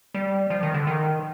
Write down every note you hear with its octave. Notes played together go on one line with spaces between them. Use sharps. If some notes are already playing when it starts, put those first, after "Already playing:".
G3
F3
D#3
D3
D#3